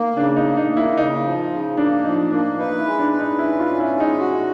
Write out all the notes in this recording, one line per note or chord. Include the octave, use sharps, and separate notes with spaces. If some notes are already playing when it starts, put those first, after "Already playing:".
Already playing: A#3 D#4
C#3 D4
D#4
A#3
D#4
A#3
E4
C#3 D#4
F3
C#3
A#3 D4
F3 D#4
A#3 D4
D#4 B4
E4
G#3
D4
B4
D#4
C#4 E4
F4
C#4
E4
G#3
D#4
F#4